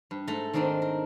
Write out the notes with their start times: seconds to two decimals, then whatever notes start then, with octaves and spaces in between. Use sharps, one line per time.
0.11 G2
0.27 G#2 A3 A4 A#5
0.53 D#3 C4 D4 D#4 A#4
0.82 A#4